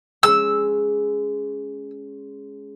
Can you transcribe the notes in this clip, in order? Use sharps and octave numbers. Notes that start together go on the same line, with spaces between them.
G#3 C#4 E6